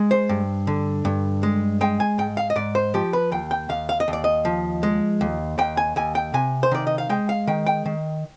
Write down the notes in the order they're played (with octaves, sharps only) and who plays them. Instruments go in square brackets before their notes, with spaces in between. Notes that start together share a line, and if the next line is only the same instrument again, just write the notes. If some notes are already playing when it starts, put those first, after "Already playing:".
Already playing: [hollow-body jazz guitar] G#3
C5
G2
D3
G2
G#3
G#3 G5
G#5
G#2 G5
F5
D#5
G#2 D5
C5
F3 G4
B4
D#2 G5
G5
D#2 F5
F5
D#5
D#2
D5
D#5
F3
G#3
D#2
D#2 G5
G#5
D#2 G#5
G5
C3 G#5
C5
D#3 D5
D#5
F5
G#3 G5
F5
D#3 G5
G5
D#3